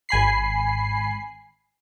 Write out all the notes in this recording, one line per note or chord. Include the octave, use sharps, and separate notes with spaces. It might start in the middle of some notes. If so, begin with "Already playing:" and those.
G#1 G#5 B5 C7